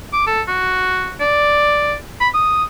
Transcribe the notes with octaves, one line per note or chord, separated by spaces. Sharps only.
D6
A4
F#4
D5
B5
D#6